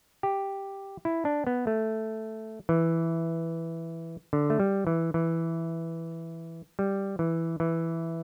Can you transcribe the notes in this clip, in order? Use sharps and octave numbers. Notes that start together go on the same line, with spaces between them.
G4
E4
D4
B3
A3
E3
D3
A3
G3
E3
E3
G3
E3
E3